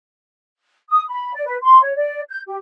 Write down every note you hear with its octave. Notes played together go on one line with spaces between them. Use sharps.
D#6
B5
D5
B4
C6
C#5
D5
G6
G4